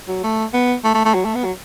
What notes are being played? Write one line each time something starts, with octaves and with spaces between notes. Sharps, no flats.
F#3
A3
B3
A3
A3
A3
F#3
A3
B3
F#3